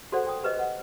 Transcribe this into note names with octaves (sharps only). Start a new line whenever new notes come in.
F#4 A4 C5 D5 F#5
G5 D#6
G4 B4 C5 D#5
F#5